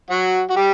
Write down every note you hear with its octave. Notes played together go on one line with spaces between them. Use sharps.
F#3 F#4
F#4
G3 G4